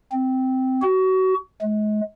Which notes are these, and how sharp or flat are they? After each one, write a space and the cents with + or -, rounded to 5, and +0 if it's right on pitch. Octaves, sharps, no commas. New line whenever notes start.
C4 -10
F#4 +25
G#3 +35